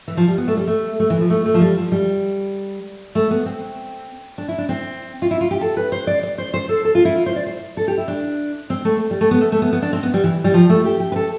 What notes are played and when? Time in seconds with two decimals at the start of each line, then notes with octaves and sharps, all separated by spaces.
0.08 E3
0.17 F3
0.28 G3
0.38 B3
0.48 A3
0.57 G3
0.67 A3
1.00 A3
1.10 E3
1.21 F3
1.30 A3
1.46 A3
1.54 F3
1.61 G3
1.77 F3
1.92 G3
3.15 A3
3.31 B3
3.46 C4
4.38 D4
4.48 E4
4.58 D4
4.69 C4
5.22 F4
5.31 E4
5.41 F4
5.51 G4
5.61 A4
5.77 B4
5.92 C5
6.07 D5
6.23 D5
6.38 C5
6.54 C5
6.69 A4
6.85 A4
6.95 F4
7.05 E4
7.16 F4
7.26 C5
7.36 D5
7.47 C5
7.77 A4
7.88 G4
7.98 E4
8.08 D4
8.70 C4
8.85 A3
9.11 G3
9.21 A3
9.31 B3
9.41 A3
9.52 A3
9.62 B3
9.73 B3
9.82 D4
9.93 C4
10.03 B3
10.14 G3
10.24 E3
10.44 G3
10.54 F3
10.69 A3
10.85 G4
11.00 G4
11.12 B4
11.16 A4